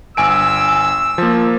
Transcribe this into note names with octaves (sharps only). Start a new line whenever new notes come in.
G1 G#5 E6 D7
F3 A#3